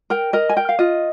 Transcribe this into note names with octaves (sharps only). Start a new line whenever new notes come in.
A#4 G5
A#4 D#5
G#5
A#4 G5
F5
F4 D#5